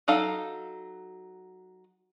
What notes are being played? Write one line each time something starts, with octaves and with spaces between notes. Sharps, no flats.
F#3 D#4 A4 F5